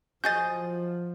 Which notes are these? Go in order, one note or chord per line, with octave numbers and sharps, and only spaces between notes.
F3 F#4 G#4 D#5 G6 A6